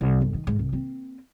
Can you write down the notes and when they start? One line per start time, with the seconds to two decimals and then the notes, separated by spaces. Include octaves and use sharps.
0.01 C2
0.20 G1 E2
0.34 D#3
0.47 G#2
0.59 C2
0.72 A#3 C4